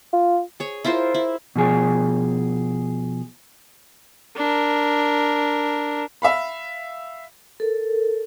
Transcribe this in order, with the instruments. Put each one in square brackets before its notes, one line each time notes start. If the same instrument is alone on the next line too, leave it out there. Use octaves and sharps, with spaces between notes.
[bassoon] F4
[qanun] G#4 C#5
E4 F4 A#4 C5
E4
[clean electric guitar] B2 F3 G#4
[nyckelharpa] D4 A#4
[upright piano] E5 F5 B5
[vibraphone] A4 A#4